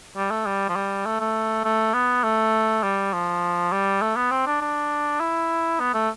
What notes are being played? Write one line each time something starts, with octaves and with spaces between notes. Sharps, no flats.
G3
A3
G3
F3
G3
A3
A3
A3
B3
A3
G3
F3
G3
A3
B3
C4
D4
D4
E4
B3
A3